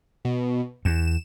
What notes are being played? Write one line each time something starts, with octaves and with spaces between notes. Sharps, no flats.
B2
E2 E7